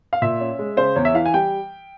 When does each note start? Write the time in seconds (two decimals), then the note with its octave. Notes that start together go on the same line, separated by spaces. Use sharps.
0.13 F5
0.22 A#2 E5
0.41 C#4
0.59 G#3
0.77 C#3 C5
0.96 E2 C#5
1.05 E5
1.14 E3 F5
1.26 G#5
1.34 G3 G5